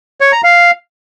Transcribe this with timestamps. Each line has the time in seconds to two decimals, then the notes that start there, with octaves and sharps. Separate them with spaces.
0.21 C#5
0.32 A#5
0.44 F5